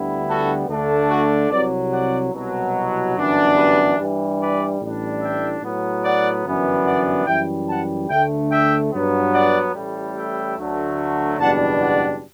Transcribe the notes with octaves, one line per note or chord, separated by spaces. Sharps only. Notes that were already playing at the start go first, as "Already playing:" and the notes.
Already playing: D2 D3 G3 B3 E4
F#4 A4
D2 D3 A3 D4
F#4
C2 C3 F#3 B4 D5
D5 F#5
C2 B2 F#3
G1 F#2 E3 B3 D4
G4 B4
G2 E3 G3
B4 D5
A1 A2 G3 D4
E5 G5
A2 F#3 B3
D5 F#5
G1 F#2 E3 B3 D4
D5 F#5
F#2 E3 G3 E5 G5
F#5 A5
D2 D3 A3 E5 G5
E5 G5
G2 F#3 B3
D5 F#5
A1 A2 G3
E5 G5
D2 D3 F#3 A3
F#1 E2 B2 G3 D4 F#5 A5
D5 F#5